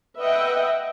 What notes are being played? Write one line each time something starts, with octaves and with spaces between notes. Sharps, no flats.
B4 D#5 E5 F#5 G5